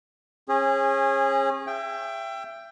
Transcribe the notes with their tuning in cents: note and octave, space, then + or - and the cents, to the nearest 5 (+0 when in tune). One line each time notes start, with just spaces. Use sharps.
C#4 -30 G#4 -15
E5 +30 G5 +5